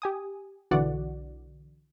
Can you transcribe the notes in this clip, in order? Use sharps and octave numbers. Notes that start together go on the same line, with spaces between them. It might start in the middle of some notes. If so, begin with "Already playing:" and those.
G4 G#5 D#6
B1 D3 E3 F#4 D5 F#5